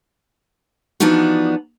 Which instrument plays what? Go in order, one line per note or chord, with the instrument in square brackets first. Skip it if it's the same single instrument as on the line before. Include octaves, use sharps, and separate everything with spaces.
[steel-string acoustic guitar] E3 F3 B3 D4 D#4 F#4